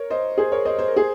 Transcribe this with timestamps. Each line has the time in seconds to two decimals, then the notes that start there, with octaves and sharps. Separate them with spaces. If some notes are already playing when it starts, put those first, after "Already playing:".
Already playing: A#4 C#5
0.10 C5 D#5
0.38 G#4 C5
0.52 A#4 C#5
0.65 C5 D#5
0.79 C5
0.88 A#4
0.97 G#4 C5